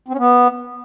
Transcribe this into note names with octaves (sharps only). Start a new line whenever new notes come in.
C4
C#4
B3